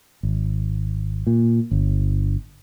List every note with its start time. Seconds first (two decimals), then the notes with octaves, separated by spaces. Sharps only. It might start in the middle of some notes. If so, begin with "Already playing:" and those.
0.23 G#1
1.27 A#2
1.71 G1